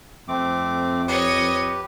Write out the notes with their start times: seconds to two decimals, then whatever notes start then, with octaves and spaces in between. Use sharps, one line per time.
0.28 F2 A3 C4 D6
1.08 G4 B4 C#5 D#5